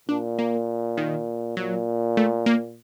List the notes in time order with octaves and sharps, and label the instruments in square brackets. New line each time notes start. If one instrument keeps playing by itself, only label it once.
[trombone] A#2 [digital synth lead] D4
[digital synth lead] A#3
D#3
[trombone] A#2 [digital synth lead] F#3
[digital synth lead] A3
A#3